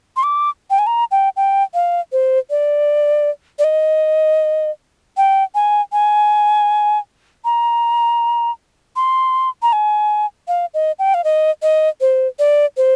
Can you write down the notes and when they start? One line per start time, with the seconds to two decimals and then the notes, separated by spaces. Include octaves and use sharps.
0.17 C6
0.23 D6
0.70 G5
0.79 G#5
0.87 A#5
1.11 G5
1.36 G5
1.74 F5
2.12 C5
2.50 D5
3.59 D5
3.64 D#5
5.17 G5
5.55 G#5
5.92 G#5
7.45 A#5
8.96 C6
9.62 A#5
9.73 G#5
10.48 F5
10.74 D#5
10.99 G5
11.14 F5
11.24 D#5
11.62 D#5
12.01 C5
12.39 D5
12.77 C5